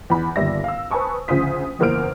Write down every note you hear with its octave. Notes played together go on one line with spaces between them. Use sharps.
E2 B5
G1 D#2 G3 E5 A#6
F5 E6
B4 C5 G#5 A5 C#6 D#6
D2 C#3 F3 C5 D#6 B6
F#1 E2 A#3 C5 F6 D7